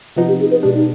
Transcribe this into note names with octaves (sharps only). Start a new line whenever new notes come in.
C3 F3 B3 D#4 F4
G4
G#4
B4
B2 G#3 D4 G4
D#4